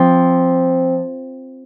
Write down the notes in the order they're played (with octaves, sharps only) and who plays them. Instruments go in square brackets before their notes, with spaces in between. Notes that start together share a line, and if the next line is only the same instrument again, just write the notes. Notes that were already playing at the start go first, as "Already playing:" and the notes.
Already playing: [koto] F3 C4